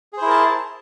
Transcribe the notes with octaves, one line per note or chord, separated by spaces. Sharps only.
E4 G#4 A#4 C5 A5